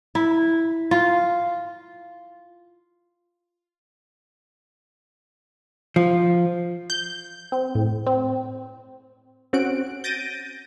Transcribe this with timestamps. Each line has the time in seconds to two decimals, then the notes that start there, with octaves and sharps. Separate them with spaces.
0.15 E4
0.91 F4
5.96 F3
6.90 G6
7.52 C4
7.75 A2
8.07 C4
9.53 C4 C#4 F#4 F#6 D7
10.04 G6 A6 A#6 D7 D#7